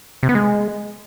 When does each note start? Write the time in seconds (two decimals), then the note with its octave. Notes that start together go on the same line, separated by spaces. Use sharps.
0.23 C3
0.29 B3
0.35 G#3